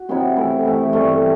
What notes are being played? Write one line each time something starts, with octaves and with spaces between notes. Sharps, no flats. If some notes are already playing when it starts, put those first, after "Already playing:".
Already playing: F#4
C3 F#3 B3 E4
E3 A3 E4
E3 A3 E4
G2 E3 A3